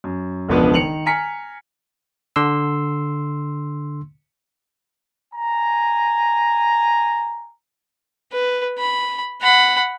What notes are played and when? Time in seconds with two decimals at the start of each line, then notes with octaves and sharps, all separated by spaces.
0.04 F#2
0.48 E1 C#2 F3 B3 D4 B4
0.74 D#3 C#7 F7 F#7
1.06 G#5 A#5 F6 B6 C#7
2.36 D3 C6 E6
5.34 G#5 A#5
8.32 B4
8.78 B5
9.41 F#5 B5